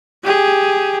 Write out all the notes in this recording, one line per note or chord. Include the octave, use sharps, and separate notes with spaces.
G4 G#4